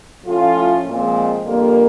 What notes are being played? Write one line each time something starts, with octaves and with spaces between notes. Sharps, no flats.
A2 F3 A3 C#4 F4
A#2 F3 G#3 C4
F2 D3 G3 A#3